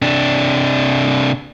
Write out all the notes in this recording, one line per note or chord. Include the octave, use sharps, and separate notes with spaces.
C3 D4